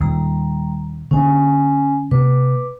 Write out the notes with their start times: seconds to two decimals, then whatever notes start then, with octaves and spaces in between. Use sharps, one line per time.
0.01 D#2 A#2 G3 A#5
1.11 D3 A#3 C#4 D4 G#5
2.11 C3 A#3 B4 D6